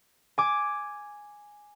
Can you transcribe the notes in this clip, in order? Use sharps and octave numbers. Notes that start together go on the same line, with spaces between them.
G#5 D6